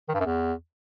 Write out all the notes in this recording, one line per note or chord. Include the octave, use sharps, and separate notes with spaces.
D#3
G2
F#2
E2